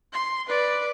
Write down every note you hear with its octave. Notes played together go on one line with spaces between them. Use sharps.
C6
B4 D5